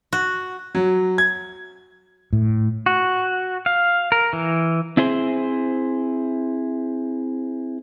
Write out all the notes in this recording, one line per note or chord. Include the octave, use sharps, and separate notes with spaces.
F#4
F#3
G#6
A2
F#4
F5
A#4
E3
C4 E4 G#4 C5